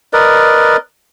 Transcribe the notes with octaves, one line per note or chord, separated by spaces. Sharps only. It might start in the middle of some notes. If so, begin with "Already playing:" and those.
A#4 B4 D5 D#5